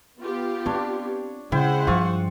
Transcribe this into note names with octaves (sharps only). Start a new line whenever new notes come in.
B3 F4 G4
C4 D4 C#5
C#3 G#3 E4 C5 F#5 G5
G2 F3 F4 C#6 E6